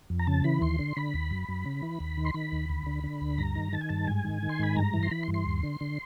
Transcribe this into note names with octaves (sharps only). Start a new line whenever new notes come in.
F2
A#5
C#3 A5
E3 B5
D#2 C6
D3
D3 B5
D#2
F#2
F#2
C#3
E3
D#2
D#3
C6
D#3 B5
D#2
D2
D3
D3
D2
G2 A#5
D#3
D#3 A5
G#5
G2 A5
G#2 G#5
D#3
D#3
C6
G#2 B5
G2 A#5
E3
C6
E3 B5
C6
G2
C6
D#2
D3
D3